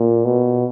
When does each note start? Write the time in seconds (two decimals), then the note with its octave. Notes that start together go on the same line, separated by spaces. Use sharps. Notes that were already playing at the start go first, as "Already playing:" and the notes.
Already playing: A#2
0.25 B2